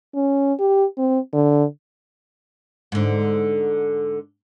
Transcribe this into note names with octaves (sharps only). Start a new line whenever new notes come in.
C#4
G4
C4
D3
G#2 D3